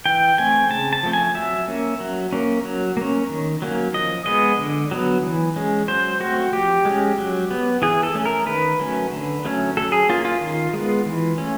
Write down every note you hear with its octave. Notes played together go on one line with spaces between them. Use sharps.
E3 G5
A3 C4 G#5
C#3 A5
A5
F3 A3 C4
G#5
F#3 E5
A#3 C#4
F#3
A#3 C#4
F#3
A#3 C#4
D#3
F#3 A#3 C#4
F3 D#5
G#3 B3 D#5
D3
F#3 B3
E3
G#3 C#4
F#3 C5
A3 C4 F#4
F3 G4
G#3 C#4
F#3
B3
E3 G#4
A4
A3 C#4
A#4
D#3 B4
F#3 A3 C#4
D3
F#3 A3 C#4
F#3 A4
G#4
A#3 C#4 F4
F4
D#3
G#3 B3
E3
A3 C#4